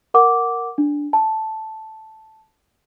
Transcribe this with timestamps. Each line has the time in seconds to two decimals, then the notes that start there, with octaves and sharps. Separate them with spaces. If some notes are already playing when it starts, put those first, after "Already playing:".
0.14 A#4 F#5 D6
0.78 D4
1.13 A5